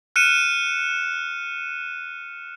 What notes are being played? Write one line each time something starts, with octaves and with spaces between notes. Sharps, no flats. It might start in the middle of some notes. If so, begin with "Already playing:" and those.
F6 F#6 C#7 D#7 E7